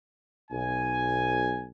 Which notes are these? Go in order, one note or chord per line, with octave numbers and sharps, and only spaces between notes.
B1 G#5